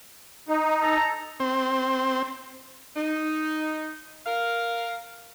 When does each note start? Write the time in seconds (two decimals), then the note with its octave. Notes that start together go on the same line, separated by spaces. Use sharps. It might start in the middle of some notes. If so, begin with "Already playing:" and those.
0.49 D#4
0.82 A4 A#5
1.40 C4
2.96 D#4
4.26 A#4 F5